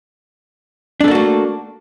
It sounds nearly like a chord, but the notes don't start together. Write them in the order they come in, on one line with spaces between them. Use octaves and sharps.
D4 A4 A#3 F#4 A3